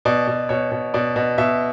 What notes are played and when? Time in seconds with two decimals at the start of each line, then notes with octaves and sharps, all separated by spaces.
0.05 B2 D5
0.27 B2
0.49 B2 C#5
0.72 B2
0.94 B2 D5
1.16 B2
1.38 B2 E5